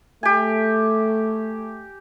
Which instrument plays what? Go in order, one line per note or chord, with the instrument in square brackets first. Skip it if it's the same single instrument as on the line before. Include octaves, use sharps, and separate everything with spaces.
[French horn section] A3 [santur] G4 G#5